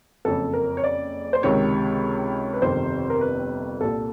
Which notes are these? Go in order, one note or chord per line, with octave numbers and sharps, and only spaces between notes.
F#1 F2 C#3 A4
A#4
C#5
D5
C5
C#2 C3 D#3 C#5
B4
G1 F2 C3 D#3 C5
A#4
B4
C2 A#2 A4